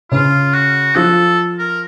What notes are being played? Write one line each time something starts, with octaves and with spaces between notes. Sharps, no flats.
C#3 C#4 F4
F#4
F3 F4 A4
A#4